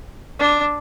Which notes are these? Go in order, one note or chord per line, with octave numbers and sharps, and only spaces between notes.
D4